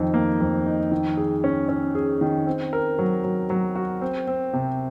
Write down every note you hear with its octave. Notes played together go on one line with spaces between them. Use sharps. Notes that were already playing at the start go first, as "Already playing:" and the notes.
Already playing: F2 D#3 D#4
A#3
F2
D#4
D#3
G#4
C#4
C#4
G#4
D#3
C4
A#4
F#3
F#3
F#3
F#4
C4
C4
C3